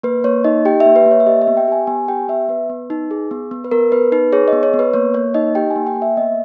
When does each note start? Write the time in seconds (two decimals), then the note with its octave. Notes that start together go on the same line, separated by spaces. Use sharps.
0.03 A#3 B4
0.24 A#3 C#5
0.44 D#4 D#5
0.65 G4 G5
0.80 E5
0.86 A#3
0.96 B4
1.06 A#3
1.11 C#5
1.20 E5
1.27 G4 D#5
1.42 E5
1.47 B3
1.57 G5
1.68 G4 G#5
1.87 B3 G#5
2.08 G4 G5
2.28 B3 E5
2.49 B3 B4
2.70 B3
2.90 D#4
3.11 G#4
3.31 B3
3.51 B3
3.64 B4
3.71 B3 A#4
3.92 B3 B4
4.12 D#4 B4
4.33 G#4 C#5
4.48 D#5
4.53 B3
4.63 C#5
4.74 B3
4.79 B4
4.94 A#3 C#5
5.14 A#3 C#5
5.34 D#4 D#5
5.55 G4 G5
5.70 G#5
5.76 A#3
5.87 G5
5.96 A#3
6.02 E5
6.17 B3 D#5